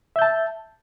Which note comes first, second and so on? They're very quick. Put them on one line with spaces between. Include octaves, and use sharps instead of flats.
E5 G6 A5